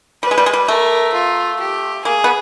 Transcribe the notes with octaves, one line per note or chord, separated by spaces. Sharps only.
G3 B4
G#3
G3
G#3
G3
A3 A#4
F4
G4
A#3 G#4
B3